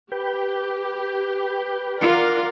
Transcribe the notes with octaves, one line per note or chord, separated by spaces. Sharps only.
G4 B4 G5
F4 A#4 D5 F#5